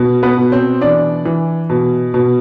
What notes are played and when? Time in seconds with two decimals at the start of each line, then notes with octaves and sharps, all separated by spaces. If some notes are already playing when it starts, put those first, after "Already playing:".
Already playing: B2
0.23 B3 B4
0.37 B2
0.52 C4 C5
0.81 E3 D4 D5
1.25 E3
1.70 B2
2.14 B2